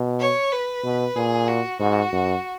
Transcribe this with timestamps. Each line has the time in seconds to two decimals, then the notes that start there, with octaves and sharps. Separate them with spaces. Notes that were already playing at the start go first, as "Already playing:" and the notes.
Already playing: B2
0.20 C#5
0.52 B4
0.84 B2
1.16 A#2 G#4
1.48 F#4
1.80 G#2 F#4
2.12 F#2